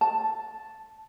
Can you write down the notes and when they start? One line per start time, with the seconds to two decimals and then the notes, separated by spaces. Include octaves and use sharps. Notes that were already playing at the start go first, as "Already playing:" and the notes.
0.01 A5